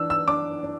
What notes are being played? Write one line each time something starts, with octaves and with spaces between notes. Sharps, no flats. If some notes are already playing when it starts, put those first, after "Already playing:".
Already playing: E3 D4 E6
E6
D4 D6
D4